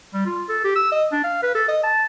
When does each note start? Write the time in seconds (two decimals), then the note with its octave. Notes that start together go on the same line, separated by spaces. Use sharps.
0.14 G3
0.26 F4
0.49 A4
0.65 G4
0.76 E6
0.92 D#5
1.12 D4
1.24 F5
1.43 B4
1.55 A4
1.69 D#5
1.84 A5